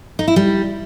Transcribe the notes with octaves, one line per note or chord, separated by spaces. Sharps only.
D#4
E4
G3